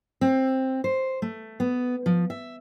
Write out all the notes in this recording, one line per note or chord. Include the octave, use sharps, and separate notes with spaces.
C4
C5
A3
B3
F3
E5